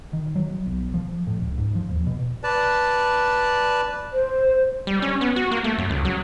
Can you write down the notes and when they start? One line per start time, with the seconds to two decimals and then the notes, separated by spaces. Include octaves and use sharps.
0.13 D#3
0.36 F#3
0.66 B1
0.94 F3
1.27 A2
1.42 C#2
1.58 G#2
1.75 F3
1.90 D#2
2.07 B2
2.43 B4 D5 A5
4.13 C5
4.87 G3
5.02 C#4
5.21 B3
5.36 F#4
5.51 A#3
5.64 A3
5.78 F#2
5.90 C#2
6.05 F#3